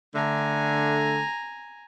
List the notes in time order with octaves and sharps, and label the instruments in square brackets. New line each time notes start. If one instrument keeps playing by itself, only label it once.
[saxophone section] D3 A3 [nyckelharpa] G#5 A#5